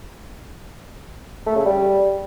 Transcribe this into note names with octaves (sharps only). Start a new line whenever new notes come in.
A3
C#3
G3